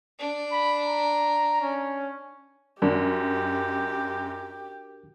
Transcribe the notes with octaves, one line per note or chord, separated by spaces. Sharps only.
D4
B5
A#5
C#4
F#2 D4 F#4 G4 A#4